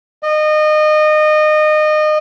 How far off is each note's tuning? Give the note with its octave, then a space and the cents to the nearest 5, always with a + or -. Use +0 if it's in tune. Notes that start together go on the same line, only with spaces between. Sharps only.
D#5 -25